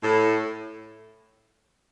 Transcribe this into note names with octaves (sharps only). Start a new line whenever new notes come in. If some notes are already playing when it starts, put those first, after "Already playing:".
A2